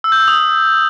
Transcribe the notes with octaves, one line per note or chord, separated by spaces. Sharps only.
E6
G6
E6
D#6